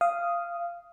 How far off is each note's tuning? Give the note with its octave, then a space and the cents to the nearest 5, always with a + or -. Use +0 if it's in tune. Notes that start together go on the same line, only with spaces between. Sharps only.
F5 -15 D#6 +0